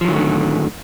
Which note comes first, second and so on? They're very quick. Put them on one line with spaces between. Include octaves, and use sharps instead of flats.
F3 F#3 D#3 A2 D3